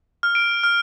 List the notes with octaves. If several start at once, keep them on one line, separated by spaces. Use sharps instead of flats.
F6
D7
F6